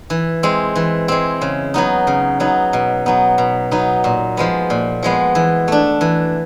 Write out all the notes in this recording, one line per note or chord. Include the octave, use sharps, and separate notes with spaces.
E3
G#3 C4
E3
G#3 C4
C#3
F#3 B3 D#4
C#3
F#3 B3 D#4
B2
F#3 B3 D#4
B2
F#3 B3 D#4
A#2
F3 G#3 B3
A#2
F3 G#3 B3
E3
A3 D4
E3